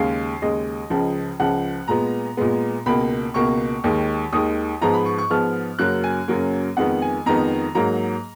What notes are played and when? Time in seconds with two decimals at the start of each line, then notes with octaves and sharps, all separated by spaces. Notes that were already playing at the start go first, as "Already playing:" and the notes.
Already playing: D#2 C#3 G#3 F5
0.42 D#2 C#3 G#3 D#5
0.90 C#2 C#3 F3
1.39 C#2 C#3 F3 F#5
1.88 A#2 G#3 B3 A#5
2.37 A#2 G#3 B3
2.86 C#2 B2 A#3 B5
3.34 C#2 B2 A#3 C#6
3.84 D#2 D#3 G#3
4.33 D#2 D#3 G#3 D#6
4.82 G#2 F3 G#3 B3 A#5
4.94 B5
5.06 C#6
5.18 C#6
5.30 G#2 F3 G#3 B3 F6
5.79 F#2 C#3 F#3 A#3 F#6
6.04 G#5
6.28 F#2 C#3 F#3 A#3
6.77 F2 D#3 G#3 B3 F#5
7.02 G#5
7.26 F2 D#3 G#3 B3 A#5
7.75 G#2 F#3 A#3 A#5